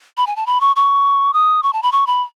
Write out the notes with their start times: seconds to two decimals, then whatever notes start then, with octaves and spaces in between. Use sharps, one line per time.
0.17 B5
0.27 G#5
0.36 A5
0.46 B5
0.61 C#6
0.76 C#6
1.33 D#6
1.63 C#6
1.73 A5
1.83 B5
1.92 C#6
2.07 B5